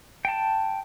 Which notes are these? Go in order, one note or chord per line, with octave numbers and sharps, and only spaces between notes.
G5 A5